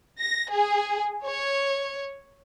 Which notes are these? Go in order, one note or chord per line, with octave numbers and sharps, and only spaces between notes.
A#6
G#4
C#5